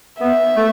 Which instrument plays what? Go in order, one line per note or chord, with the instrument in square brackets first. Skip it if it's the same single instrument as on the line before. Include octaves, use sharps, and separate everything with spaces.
[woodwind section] B3 [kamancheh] E5
[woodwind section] A3